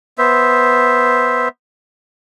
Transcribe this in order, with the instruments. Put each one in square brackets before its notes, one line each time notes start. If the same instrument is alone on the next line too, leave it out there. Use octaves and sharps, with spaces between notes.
[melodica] B3 C5 E5